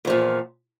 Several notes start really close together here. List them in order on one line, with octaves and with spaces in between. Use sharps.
E2 F3 A#2